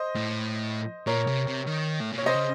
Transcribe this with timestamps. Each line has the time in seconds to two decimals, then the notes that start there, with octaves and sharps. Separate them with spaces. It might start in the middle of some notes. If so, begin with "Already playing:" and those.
Already playing: C5 D#5
0.15 A2
1.07 A#2 A#4 C#5
1.27 C3
1.47 C3
1.67 D#3
2.01 A2
2.12 A#2
2.18 C#5
2.23 C3 C5 D#5
2.34 C#3